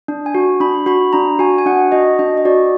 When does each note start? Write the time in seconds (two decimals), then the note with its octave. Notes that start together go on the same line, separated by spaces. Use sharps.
0.08 D4
0.26 G#5
0.35 F#4
0.60 D4 B5
0.86 F#4 B5
1.13 D4 A#5
1.39 F#4 G#5
1.58 G#5
1.66 D4 F#5
1.92 F#4 D#5
2.19 D4 D#5
2.37 D#5
2.45 F#4 D5